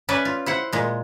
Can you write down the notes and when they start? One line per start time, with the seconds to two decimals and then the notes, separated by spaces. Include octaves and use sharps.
0.09 C#4 B4 D5 E5
0.25 F4
0.46 E4 C5 F#5
0.73 A#2 G#3